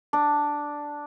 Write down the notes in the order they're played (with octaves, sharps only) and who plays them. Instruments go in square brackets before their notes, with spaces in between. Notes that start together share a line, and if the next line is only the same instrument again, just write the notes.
[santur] D4